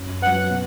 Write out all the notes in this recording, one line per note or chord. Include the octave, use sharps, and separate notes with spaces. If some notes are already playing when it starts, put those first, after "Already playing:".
Already playing: F#2
F#3 C#4 B4 F#5
B2